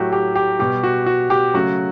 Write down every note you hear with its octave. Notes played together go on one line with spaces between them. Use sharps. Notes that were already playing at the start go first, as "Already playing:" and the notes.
Already playing: A2 F#3 A3 F#4 G4
G4
G4
B2 G3 G4
F#4
F#4
G4
C#3 F#3 A3 F#4